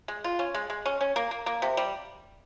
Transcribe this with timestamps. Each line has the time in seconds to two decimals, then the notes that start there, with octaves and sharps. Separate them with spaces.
0.08 G#3
0.24 F4
0.39 C#4
0.55 G#3
0.70 G#3
0.86 C#4
1.01 C#4
1.16 A#3
1.31 A#3
1.46 A#3
1.62 C3
1.77 G3